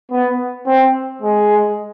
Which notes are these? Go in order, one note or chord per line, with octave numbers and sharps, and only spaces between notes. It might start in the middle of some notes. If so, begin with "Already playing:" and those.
B3
C4
G#3